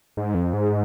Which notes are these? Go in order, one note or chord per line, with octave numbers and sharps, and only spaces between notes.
G#2
F2
G#2